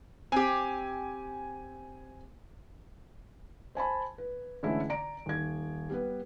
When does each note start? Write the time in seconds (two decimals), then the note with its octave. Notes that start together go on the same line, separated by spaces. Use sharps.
0.32 C4 G4 G#5
3.75 C5 G#5 A5 B5
4.18 B4
4.63 D3 E3 G#3 A3 C#4 E4
4.89 D5 A#5 D7
5.26 D#1 G#6
5.90 G3 B3 B4